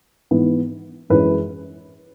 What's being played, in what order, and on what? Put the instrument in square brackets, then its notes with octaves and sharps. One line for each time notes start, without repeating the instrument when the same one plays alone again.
[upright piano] G#2 E3 B3
F#2 E3 G#3 C#4 B4